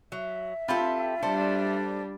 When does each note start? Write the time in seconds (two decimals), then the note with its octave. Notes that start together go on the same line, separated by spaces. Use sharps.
0.12 F#3 E5
0.68 C4 F4 G4 A4 B5
1.23 G3 D4 A4 C5 D5